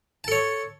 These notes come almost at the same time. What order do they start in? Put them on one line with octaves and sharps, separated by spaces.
A5 A4 C#5